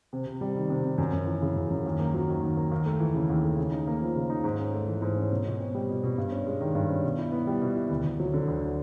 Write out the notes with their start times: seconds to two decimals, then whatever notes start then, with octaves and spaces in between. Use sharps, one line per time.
0.13 C3
0.26 C3
0.41 G3
0.56 D#3
0.70 C3
0.84 C3
0.98 F#2
1.13 F#2
1.27 E3
1.42 C#3
1.56 F#2
1.70 F#2
1.86 D#2
1.99 A#3
2.14 F#3
2.28 D#3
2.43 D#2
2.57 A#3
2.72 D#2
2.86 A3
3.00 E3
3.15 C#3
3.29 D#2
3.43 A3
3.58 C#3
3.72 D#4
3.87 A#3
4.01 F3
4.16 C#3
4.30 D#4
4.44 G#2
4.58 C#4
4.74 A3
4.88 E3
5.02 G#2
5.16 C#4
5.31 B2
5.45 B2
5.59 C4
5.74 G3
5.89 B2
6.04 B2
6.18 G2
6.32 C#4
6.47 G#3
6.61 D#3
6.75 G2
6.89 C#4
7.03 B2
7.18 E4
7.32 B3
7.47 G3
7.62 B2
7.75 E4
7.90 D2
8.04 D2
8.20 F#3
8.34 D3
8.48 D2